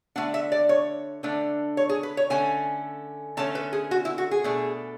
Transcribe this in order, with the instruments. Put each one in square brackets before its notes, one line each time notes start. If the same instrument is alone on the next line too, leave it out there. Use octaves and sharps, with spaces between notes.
[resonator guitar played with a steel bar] D3 A3 D4 F#5
E5
D5
C#5
D3 A3 D4
C#5
G#4
B4
C#5
D3 A3 C#4 G#5
D3 A3 C#4 A5
B4
G#4
F#4
E4
F#4
G#4
B2 A3 D4